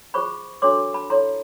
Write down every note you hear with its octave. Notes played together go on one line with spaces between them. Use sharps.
F4 G#4 C5 B5 C#6
D4 F#4 A4 C#5 C6 D6
A5 B5
E4 A4 C#5 A#5 C6